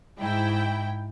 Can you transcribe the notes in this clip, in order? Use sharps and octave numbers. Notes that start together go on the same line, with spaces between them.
G#2 E4 G5